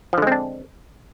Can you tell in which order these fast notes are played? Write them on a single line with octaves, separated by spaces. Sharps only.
F3 D3 G#3 C4 D4